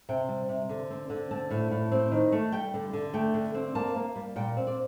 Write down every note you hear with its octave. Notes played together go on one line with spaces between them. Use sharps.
C3 G5
G3
C3
D3
C4
D3
C4 A5
A2
A2
C4
D#3
A3
G3 G5
D3
D3
A3 G5
D3
C4
A#3 A5
A#3
G3
A#2 G5
C4
D5